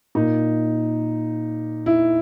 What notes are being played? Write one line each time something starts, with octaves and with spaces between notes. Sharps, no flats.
A#2 D#4
E4